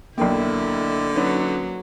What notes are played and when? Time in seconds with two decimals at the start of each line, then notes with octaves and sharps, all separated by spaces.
0.18 B1 D3 A#3 E4 A#4 D5 G5
1.15 F#3 C#4 D#4 B4